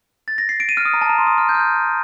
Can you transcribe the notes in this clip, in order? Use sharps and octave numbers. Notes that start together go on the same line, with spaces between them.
A6
A#6
C7
D7
D#7
F6
D#6
A#5
A5
A#5
C6
D#6
F6
G6
F6
G6